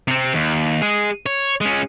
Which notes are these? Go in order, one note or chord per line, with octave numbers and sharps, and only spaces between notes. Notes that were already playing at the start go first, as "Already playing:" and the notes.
C3 C4
D#2
G#3 G#4
C#5
G#3 C#4